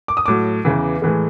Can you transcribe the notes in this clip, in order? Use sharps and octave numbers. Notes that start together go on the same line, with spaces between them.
D6
D#6
A2 F#3 D6
E2 C#3 E3
A2 E3 G#3